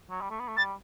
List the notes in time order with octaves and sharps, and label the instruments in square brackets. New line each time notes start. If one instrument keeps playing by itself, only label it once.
[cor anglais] F#3
G3
A3
B3
A3
[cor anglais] G3 [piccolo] A6